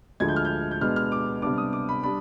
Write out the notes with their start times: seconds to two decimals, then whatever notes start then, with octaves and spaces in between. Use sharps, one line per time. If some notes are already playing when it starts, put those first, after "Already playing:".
0.20 D2 D3 F3 G#3 G#6
0.28 G6
0.36 F6
0.45 G6
0.71 G6
0.81 B2 G#3 B3 D4 F6
0.96 F6
1.12 D6
1.42 C3 G3 B3 D4 D6
1.58 D#6
1.73 D6
1.89 B5
2.03 G3 D4 B5